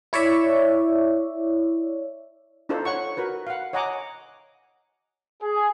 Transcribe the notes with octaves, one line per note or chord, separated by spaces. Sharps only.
E4 C#5 D5 E5
D4 D#4 F4 A4 C5
C#5 F#5 C#6
F#4 A#4 B4
F5 F#5
C#5 D#5 F#5 G#5 A#5 D6
G#4